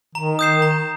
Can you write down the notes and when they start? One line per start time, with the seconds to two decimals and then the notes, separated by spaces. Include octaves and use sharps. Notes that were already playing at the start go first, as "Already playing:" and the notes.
0.15 D#3 A#5
0.39 D#6 G6 C7 E7
0.62 A#5